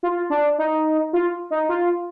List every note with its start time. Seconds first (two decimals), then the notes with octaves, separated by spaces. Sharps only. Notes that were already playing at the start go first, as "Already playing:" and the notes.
0.03 F4
0.30 D4
0.58 D#4
1.13 F4
1.50 D#4
1.69 F4